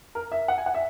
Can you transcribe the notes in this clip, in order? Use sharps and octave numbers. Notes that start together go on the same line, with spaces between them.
A#4
E5
F#5
G#5
F#5
E5